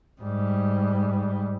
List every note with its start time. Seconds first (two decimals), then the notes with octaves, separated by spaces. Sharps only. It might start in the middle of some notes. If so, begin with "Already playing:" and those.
0.22 G#2 G3